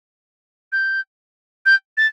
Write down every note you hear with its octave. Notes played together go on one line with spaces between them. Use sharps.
G6
G6
A6